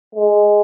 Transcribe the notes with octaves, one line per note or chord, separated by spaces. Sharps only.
G#3